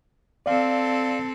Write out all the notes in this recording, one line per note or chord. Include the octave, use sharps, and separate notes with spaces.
C4 A4 D5 F5